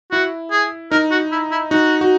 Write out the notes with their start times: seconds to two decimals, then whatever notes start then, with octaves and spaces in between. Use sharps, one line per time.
0.12 E4 F#4
0.51 G#4
0.92 D#4 A#4
1.11 F#4
1.32 E4
1.51 E4
1.71 D#4 F#4
2.01 F#4